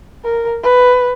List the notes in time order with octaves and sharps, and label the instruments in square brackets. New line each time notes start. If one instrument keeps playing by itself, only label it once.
[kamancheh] A#4
B4